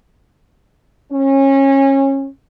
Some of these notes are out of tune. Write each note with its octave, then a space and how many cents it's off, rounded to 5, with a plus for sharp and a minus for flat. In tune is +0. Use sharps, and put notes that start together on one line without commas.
C#4 -25